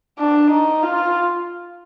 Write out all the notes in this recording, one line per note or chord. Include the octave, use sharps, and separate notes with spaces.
D4
D#4
F4